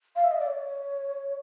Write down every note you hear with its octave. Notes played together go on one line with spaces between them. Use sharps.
F5
E5
D#5
D5
C#5